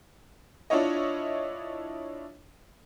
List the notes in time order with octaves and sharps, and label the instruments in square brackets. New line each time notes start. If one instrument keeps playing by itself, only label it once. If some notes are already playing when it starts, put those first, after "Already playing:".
[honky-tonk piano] D4 E4 F4 C#5 D#5